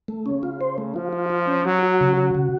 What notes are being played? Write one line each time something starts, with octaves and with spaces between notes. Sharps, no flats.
A3
C#3 C#4
F4
C5
A3
F3 F4
F4
F4
C#4
F#3 F#4
F#4
C#3
F#4
C#3